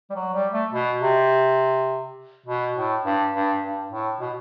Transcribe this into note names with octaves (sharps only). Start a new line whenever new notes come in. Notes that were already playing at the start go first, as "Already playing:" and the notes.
G3
F#3
G3
A3
B2
C3
B2
A2
G2
G2
G2
A2
B2